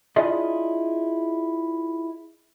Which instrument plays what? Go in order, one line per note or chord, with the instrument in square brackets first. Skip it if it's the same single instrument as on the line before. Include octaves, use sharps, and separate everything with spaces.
[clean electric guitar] D4 E4 F4 G#4 D5 D#5